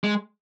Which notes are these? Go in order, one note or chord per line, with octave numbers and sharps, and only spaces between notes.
G#3